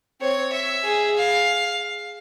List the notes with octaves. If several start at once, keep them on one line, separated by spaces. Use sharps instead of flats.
C4 C#5
E5
G#4
F5